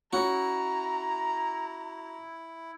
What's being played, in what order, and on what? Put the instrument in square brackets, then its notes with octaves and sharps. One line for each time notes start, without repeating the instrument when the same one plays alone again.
[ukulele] C#4 [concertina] E4 [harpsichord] F#4 [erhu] A#5